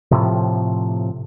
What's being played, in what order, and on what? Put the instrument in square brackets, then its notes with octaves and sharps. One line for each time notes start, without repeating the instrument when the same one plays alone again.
[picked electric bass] A2 C3 F3